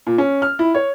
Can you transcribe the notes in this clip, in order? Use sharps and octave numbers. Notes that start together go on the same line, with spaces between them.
A#2
C#4
F6
E4
C#5